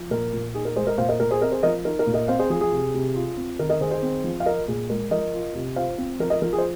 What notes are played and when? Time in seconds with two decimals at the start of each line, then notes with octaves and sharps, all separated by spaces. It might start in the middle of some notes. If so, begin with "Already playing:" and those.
Already playing: F3
0.10 A#2 A#4
0.33 A#2
0.54 D#4 G#4
0.65 A#4
0.76 G#3 G#4 C5
0.87 A#4 D#5
0.98 A#2 C5 F5
1.08 A#4 D#5
1.20 A#2 A#4
1.31 G#4 C5
1.41 C4 A#4 D#5
1.52 G#4 C5
1.63 F3 A#4 D#5
1.85 D#4 A#4
1.99 A#4
2.07 A#2
2.14 A#4 D#5
2.28 C4 C5 F5
2.39 G#4 C5
2.50 F3 G#4
2.61 G#4
2.72 C3
2.94 C3
3.15 F4
3.37 C4
3.59 D#3 A#4
3.69 A#4 D#5
3.81 D#3 G#4 C5
3.91 G#4 C5
4.02 C4
4.24 F3
4.40 F5
4.46 F4 A#4 D#5
4.68 A#2 G#4
4.90 G#3 A#4
5.11 F3 A#4 D#5
5.33 F4
5.55 C3
5.76 F4 C5 F5
5.98 C4
6.20 F3 A#4
6.30 A#4 D#5
6.42 F3 A#4
6.53 G#4
6.58 C5